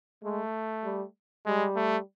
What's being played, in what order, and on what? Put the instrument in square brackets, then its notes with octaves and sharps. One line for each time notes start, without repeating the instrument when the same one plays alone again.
[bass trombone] G#3 [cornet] A3
[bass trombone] G3
[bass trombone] G3 [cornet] G#3
[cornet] A3